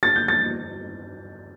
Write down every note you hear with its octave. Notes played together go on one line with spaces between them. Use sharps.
A6
G6
A6